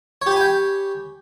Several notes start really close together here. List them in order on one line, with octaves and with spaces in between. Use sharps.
C#5 G4 B5 G#5 G5